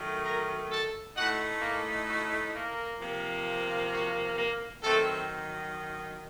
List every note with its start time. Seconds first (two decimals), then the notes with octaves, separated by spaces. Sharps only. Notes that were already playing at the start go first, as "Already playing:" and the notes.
Already playing: D#3 F#3 A3
0.24 A#4 A#5
0.71 A4 A5
1.16 A2 A3 D#4 F#4 F#5
1.61 A#3 A#4
2.07 F#4
2.54 A#3 A#4
2.99 C3 F3 A#3
3.91 F#4
4.36 A#3 A#4
4.82 D#3 F#3 A3 C4 A4